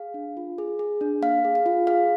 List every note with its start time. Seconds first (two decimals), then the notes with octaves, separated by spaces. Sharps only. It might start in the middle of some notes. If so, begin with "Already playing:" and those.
Already playing: G#4 F5
0.14 D4
0.37 F4
0.58 G#4
0.79 G#4
1.01 D4
1.22 A#3 F5
1.45 G#4
1.55 F5
1.66 F4
1.87 G#4 F5